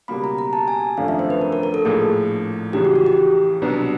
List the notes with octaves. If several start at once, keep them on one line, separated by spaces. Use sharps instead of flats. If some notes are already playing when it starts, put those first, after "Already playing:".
C#2 B2 G3 A#3 B5
A#5
A#5
A5
G#5
G#1 F#2 D3 F3 A3 F5
E5
C5
B4
A#4
A#4
A#4
A4
A#1 A2 F3 A#3 G#4
C#2 C#3 E3 G4
F#4
F#4
G4
C2 B2 F#3 B3 D4